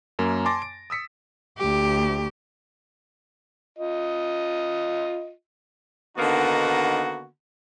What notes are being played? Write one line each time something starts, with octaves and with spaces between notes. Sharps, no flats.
F#2 A#3
G#5 A5 C6 D6 A6 A#6
D7
D#6 E6 B6 C#7
D2 G4
F4 D#5
D3 D#3 A#3 B3 D#4 F#4